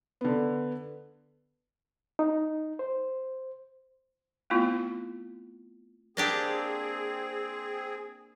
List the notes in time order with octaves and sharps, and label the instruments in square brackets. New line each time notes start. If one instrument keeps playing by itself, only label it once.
[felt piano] D3 B3
[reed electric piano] D#4
C5
[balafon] A3 B3 C4 E4 F4
[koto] A#3 D4 G4 [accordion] C4 G#4